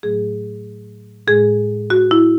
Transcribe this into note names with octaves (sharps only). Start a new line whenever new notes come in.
A2 F#3 A3 G#4
A2 G#3 G#4
F#4
E4